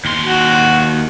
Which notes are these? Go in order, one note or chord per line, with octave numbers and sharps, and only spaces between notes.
D#2 C6
F#4